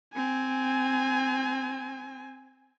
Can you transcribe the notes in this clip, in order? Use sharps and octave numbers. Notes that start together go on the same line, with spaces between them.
C4 G#5